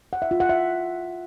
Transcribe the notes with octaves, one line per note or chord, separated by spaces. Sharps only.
F#5
E5
F4
F#5
E5